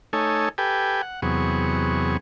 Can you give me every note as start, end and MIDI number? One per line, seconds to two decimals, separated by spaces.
0.13 0.49 57
0.13 0.49 63
0.13 0.49 69
0.13 0.49 73
0.13 0.49 80
0.58 1.02 67
0.58 1.02 69
0.58 1.02 71
0.58 1.02 79
0.58 1.02 80
1.02 1.21 78
1.22 2.17 40
1.22 2.17 48
1.22 2.17 54
1.22 2.17 59
1.22 2.17 68
1.22 2.17 85